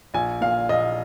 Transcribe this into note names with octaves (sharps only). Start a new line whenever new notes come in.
A#1 G#5
A#2 F5
A#1 D#5